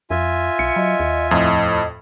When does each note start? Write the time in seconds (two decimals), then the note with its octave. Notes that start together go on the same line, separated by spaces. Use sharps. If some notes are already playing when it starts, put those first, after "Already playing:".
0.10 F2 F4 E5 G#5
0.59 B1 C#7
0.76 F#3 D#5
1.00 D#2
1.31 F2 A2 D#5